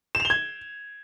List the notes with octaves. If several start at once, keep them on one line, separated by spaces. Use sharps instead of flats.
E7
F7
G7
G#6